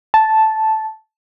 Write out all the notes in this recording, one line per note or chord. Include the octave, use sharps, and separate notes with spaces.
A5